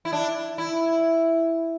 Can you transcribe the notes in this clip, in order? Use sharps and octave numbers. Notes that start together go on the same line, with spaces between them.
E4
D4
E4